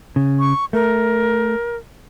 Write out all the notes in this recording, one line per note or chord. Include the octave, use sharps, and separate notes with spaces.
C#3
C#6
A3 A#4